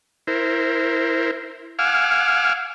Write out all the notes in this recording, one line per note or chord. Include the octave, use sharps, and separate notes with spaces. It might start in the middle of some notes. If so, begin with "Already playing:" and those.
E4 A#4 C5
F5 F#5 G#5 D6 E6 F6